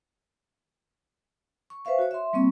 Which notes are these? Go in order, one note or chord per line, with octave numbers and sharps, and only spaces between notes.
C#6
B4 C5 E5 F5 C#6
F#4 C#5
E5 C6
G3 A#3 C4 C#6